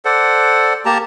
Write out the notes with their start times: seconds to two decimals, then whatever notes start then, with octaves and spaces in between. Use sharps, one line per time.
0.05 A4 C5 D5 F#5
0.86 A#3 G4 A5 A#5